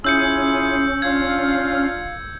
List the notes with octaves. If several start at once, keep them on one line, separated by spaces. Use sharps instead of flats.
C#4 E4 F4 G#4 E6 G6 C#7
D4 F4 F5 G#6